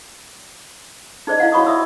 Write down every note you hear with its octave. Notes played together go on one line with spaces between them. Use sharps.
D#4 G#4 C5 D5 D#5
E4 F5 F#5
F#4 C#5 B5 C#6 D#6
D5 E5 D#6 E6